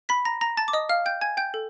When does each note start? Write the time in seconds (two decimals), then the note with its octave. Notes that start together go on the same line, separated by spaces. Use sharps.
0.09 B5 B6
0.25 A#5 A#6
0.41 A#5 A#6
0.57 A5 A6
0.68 D6
0.73 D#5 D#6
0.89 F5 F6
1.06 G5 G6
1.21 G#5 G#6
1.37 G5 G6
1.54 A4